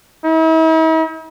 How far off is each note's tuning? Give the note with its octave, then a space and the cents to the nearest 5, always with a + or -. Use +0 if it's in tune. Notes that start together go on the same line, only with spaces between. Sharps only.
E4 -45